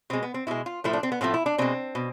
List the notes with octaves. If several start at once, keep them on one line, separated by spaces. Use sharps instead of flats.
B2 G#3 C4
B3
C4
B2 G#3 E4
F4
A2 F3 A3 E4
D4
C4
B3
A2 F3 A3 C4
E4
D4
B2 G#3 C4
B2